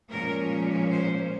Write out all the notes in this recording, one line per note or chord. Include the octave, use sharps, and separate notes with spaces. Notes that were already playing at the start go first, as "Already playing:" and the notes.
A#2 F3 G#3 C#4 A#4
C5